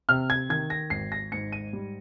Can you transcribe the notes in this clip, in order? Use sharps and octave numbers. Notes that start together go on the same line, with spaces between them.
C3 F6
G#6
D#3 G#6
A#6
G#1 C7
A#6
G#2 C#7
D#7
G3